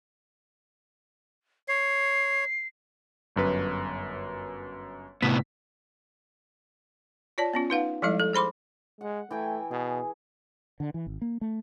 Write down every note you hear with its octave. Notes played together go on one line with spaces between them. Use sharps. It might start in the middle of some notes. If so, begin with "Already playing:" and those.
C#5 C7
G1 F#2 B4
A2 C3 B3 B6
F4 C#5 D5 A5
B3 C#4 F4
D#4 B4 F5 F#5
F3 G3 G#3 E4 A4 D#5
A4
G#4 C5 B5 C6 D6
G#3 F#5
E3 A3 G5 G#5
B2 G#4
D3
E3
G#1
A#3
A3